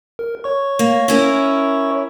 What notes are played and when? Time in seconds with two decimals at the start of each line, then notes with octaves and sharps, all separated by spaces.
0.19 A#4
0.44 C#5 C#6
0.79 A#3
1.08 C#4 E4 A#4